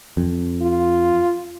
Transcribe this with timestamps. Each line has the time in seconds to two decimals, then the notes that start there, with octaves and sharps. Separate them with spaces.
0.17 F2
0.62 F4